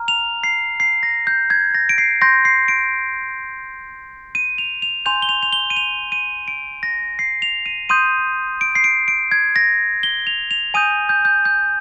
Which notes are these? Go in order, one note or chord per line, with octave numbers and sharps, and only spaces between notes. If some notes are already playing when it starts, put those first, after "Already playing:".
Already playing: A#5 F6
F7
C7
C7
A#6
G6
G#6
A#6
D7
C7
C6 G6 A#6
C7
D7
D#7
F7
F7
G#5 C6 G6 F7
G7
F7
F7
G7
D#7
F7
D#7
D7
A#6
C7
F7
D#7
C6 D#6 G6 D#7
D7
C7
D7
D7
G#6
A#6
G7
F7
F7
G#5 D#6 G6 D#7
G6
G6
G6